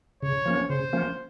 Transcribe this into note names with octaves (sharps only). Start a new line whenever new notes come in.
C#3 C#5
F3 A#3 C#4
C#3 C5
F3 A#3 C#4